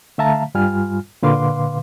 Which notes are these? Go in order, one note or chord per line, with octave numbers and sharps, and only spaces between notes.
D3 A3 E5 F5 A5 A#5
G2 G3 F4 G#5 F6
A#2 D3 B4 F5 C6 D6